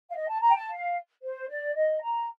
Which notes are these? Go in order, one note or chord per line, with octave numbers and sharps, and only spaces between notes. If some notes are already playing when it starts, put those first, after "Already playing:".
F5
D#5
A5
A#5
G5
A5
F5
C5
D5
D#5
A#5